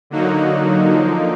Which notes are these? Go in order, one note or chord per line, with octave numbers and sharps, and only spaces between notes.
D3 F#3 A#3 D#4 F#4
D3 F3 A#3 D#4